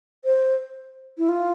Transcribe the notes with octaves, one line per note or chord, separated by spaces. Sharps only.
C5
E4
F4